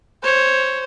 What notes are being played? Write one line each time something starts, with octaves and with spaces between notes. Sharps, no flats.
C5 C#5